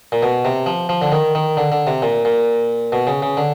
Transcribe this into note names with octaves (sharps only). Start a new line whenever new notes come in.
A#2
B2
C3
F3
F3
D3
D#3
D#3
D3
D3
C3
A#2
A#2
B2
C#3
C#3
D3